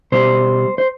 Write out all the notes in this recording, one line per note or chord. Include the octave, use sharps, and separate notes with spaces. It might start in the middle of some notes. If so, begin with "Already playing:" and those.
B2 G3 C5
C5